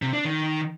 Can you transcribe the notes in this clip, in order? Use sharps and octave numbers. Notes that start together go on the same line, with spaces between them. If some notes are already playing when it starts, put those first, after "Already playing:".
C3
D4
D#3